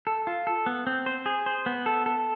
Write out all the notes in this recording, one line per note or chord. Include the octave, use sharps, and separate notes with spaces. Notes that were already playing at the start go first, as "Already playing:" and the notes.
A4
F4
A4
B3
C4
C5
G#4
C5
B3
A4
A4